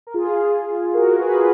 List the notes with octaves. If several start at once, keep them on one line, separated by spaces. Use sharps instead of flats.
A#4
F4 G#4
F#4 A#4
G#4 B4